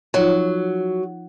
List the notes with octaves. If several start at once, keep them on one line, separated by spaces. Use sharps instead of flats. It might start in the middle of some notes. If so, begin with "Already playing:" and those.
F3 F#3 D#4 F4